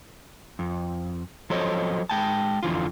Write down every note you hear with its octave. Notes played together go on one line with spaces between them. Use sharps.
F2
F3 F#3 A4 C5 C#5 D#5
G#3 G5 A5
F2 D3 E3 F4